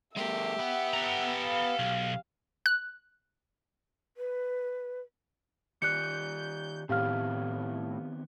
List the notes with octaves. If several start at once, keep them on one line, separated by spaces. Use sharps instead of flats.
G#3 A#3 G4 E5
B3 F#5
A4 A#5
F5
B1
F#6
B4
D#3 G4 D5 F#6 G6 C#7
A2 D#3 B3 C4 G4 F5 F6